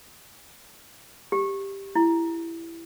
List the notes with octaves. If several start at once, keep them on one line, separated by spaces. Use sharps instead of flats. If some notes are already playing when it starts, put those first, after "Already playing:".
G4
E4